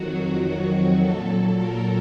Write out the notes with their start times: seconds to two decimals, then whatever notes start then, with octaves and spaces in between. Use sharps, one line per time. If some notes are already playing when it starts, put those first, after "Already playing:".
Already playing: F2 D#3 F#3 F#4
1.00 A#2 F#3 A4
1.59 A#4